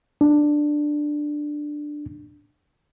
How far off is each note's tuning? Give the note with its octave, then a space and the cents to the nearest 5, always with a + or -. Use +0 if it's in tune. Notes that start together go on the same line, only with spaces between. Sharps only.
D4 +10